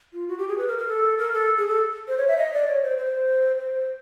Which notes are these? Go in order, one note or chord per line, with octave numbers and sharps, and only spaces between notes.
F4
F#4
G4
G#4
B4
A#4
A#4
A4
A#4
A4
G#4
A4
C5
C#5
E5
D#5
D5
C#5
C5
C5
C5